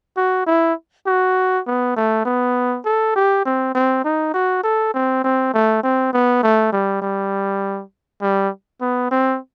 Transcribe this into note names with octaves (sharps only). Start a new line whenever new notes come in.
F#4
E4
F#4
B3
A3
B3
A4
G4
C4
C4
D#4
F#4
A4
C4
C4
A3
C4
B3
A3
G3
G3
G3
B3
C4